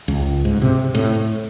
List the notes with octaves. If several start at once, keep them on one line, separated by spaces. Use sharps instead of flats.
C#2
G#2
C3
A2